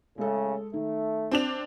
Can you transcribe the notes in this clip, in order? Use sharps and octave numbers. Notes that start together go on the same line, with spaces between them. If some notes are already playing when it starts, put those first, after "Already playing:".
A2 C#3 G#3 A4
D#3 A3
C4 D4 F7